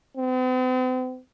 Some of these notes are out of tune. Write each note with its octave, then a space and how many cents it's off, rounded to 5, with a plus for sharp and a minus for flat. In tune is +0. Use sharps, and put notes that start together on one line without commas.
C4 -45